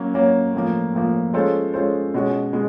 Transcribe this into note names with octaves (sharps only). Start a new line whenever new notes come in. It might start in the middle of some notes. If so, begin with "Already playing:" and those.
Already playing: F#3 A#3 C#4
F#3 A#3 C#4
A2 F3 A#3
A2 F3 A#3
G#3 C#4 F4 A4 C5
G#3 C#4 F4 A4 C5
B2 G#3 C#4 F#4
B2 G#3